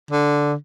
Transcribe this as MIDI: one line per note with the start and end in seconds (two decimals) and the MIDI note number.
0.11 0.53 50